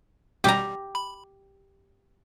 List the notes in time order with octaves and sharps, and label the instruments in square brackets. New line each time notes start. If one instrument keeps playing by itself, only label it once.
[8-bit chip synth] G#1 B2 G3 [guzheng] G4 A#5
[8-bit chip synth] B5